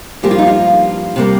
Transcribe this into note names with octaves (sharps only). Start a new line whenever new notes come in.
G2 F3 A#3 G4
F4
D#4
F4
C3 G3 A#3